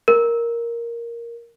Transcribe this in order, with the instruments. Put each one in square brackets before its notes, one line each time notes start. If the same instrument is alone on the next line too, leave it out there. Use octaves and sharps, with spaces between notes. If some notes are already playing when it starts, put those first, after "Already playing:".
[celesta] A#4